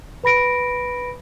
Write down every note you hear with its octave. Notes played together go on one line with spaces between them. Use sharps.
B4 B5 A#6 D7